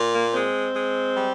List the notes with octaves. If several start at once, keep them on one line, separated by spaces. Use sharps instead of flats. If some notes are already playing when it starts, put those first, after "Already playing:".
Already playing: A#2
A#3
G#3 C4
G#3
G3